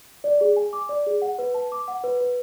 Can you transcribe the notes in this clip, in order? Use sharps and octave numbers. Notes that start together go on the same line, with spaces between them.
D5
G#4
G#5
D6
D5
G#4
F#5
B4
A5
D6
F#5
B4
B4